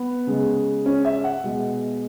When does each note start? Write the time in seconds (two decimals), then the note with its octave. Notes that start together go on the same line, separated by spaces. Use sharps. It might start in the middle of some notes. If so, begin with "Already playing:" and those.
Already playing: B3
0.27 C#3 G#3
0.86 C#4
1.05 E5
1.24 F#5
1.44 B2 G#3